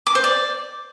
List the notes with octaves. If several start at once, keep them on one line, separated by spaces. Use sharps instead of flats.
D6
C5
D5